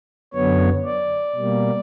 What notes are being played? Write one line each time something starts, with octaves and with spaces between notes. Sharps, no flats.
F#2 D3 F#3 B3 C#5
D5
B2 G3 A#3